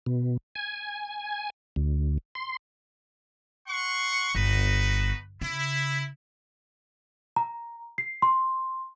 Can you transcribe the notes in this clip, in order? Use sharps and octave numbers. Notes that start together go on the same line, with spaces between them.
B2
G#5
D2
C6
F#5 C6 C#6
G1 D#4 F#4 B4
C#3 E4
A#5
C7
C6